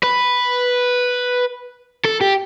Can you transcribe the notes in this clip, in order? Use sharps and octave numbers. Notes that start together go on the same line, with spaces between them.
B4
A4
G4